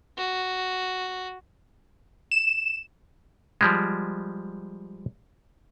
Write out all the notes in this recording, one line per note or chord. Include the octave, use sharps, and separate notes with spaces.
F#4
E7
F3 G3 G#3